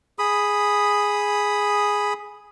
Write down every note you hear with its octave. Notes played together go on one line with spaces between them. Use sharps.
G#4 B5 D#6